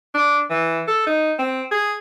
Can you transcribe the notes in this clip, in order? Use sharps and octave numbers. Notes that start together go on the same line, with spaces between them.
D4
E3
A4
D#4
C4
G#4